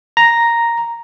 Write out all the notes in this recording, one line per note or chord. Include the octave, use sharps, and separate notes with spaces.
A#5